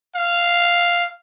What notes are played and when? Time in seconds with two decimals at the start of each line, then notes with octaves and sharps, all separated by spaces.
0.15 F5